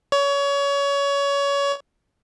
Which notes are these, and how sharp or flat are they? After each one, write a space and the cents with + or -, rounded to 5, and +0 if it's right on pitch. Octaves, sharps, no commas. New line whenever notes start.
C#5 +25